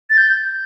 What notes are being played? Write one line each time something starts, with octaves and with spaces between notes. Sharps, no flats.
A6
G6